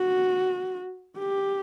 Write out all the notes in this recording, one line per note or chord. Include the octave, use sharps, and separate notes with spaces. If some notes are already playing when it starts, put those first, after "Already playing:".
Already playing: F#4
G4